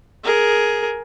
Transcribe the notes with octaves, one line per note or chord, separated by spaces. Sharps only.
G#4 A#4